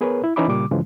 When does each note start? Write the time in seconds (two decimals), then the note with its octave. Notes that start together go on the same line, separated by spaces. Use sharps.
0.01 B3 G#4 A#4 B4 C#5
0.24 E4
0.36 E3 C#4 D#4 E5 B5 D6
0.48 A#2 C#3 G3 D6
0.71 G2 C#3 E3 F3 G#3